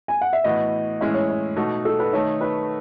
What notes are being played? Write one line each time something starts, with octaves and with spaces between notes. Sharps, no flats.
G#5
F#5
E5
A2 E3 B3 F#4 D#5
A2 E3 G#3 C#4 E4 D#5
C#5
C#5
B2 A3 D#4 F#4
A4
B4
D#3 A3 D#4 C#5
B4